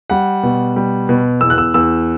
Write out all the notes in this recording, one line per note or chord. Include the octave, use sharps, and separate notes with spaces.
G3 F#5
B2
G3
B2
E2 E6
F#6
E6
E2 E6